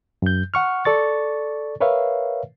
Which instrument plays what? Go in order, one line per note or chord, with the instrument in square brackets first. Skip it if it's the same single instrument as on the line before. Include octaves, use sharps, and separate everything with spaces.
[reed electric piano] F#2 G6
F#5 C#6 F6
A4 D5 C#6 A6
A#4 B4 C#5 E5 F5